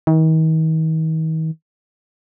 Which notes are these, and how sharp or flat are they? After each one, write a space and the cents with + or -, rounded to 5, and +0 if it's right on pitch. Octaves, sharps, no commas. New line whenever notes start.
D#3 +40